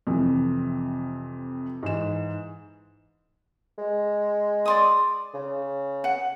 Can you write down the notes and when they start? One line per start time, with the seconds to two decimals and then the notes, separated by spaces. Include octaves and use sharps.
0.07 F2 C3 E3
1.83 G#2 E3 E7
3.78 G#3
4.65 D5 C6 D#6
5.34 C#3
6.04 F#5